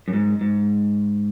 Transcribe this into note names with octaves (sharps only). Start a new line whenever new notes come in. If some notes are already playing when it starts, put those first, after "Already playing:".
F#2
G#2
G#2